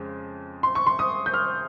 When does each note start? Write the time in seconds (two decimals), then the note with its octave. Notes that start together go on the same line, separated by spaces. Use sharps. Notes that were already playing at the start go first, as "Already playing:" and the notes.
Already playing: F2 C#3 G#3
0.63 C6
0.75 C#6
0.87 C6
0.99 D#6
1.26 G6
1.34 F6